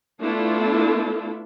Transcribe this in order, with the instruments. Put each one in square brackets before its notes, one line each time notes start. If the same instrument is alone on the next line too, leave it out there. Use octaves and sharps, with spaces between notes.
[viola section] A3 B3 D4 E4 F4 A4